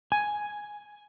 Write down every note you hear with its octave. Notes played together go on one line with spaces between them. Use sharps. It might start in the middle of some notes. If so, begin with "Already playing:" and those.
G#5